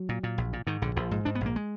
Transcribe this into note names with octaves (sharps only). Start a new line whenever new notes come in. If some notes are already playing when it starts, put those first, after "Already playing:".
Already playing: F#3
A#2
A#2
A#1
A#2
G#2 D#3
A#1 D3
A#1 F3
G#2
G#2 D4
B3
A#1 A#3
G#3